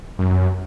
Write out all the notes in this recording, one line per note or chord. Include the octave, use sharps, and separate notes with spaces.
F#2